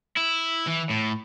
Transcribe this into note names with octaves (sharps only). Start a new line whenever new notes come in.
E4
E3
A2